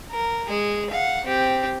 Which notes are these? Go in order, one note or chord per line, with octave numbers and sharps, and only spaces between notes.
A#4
G#3 G#4
F5 F#5
C4 G4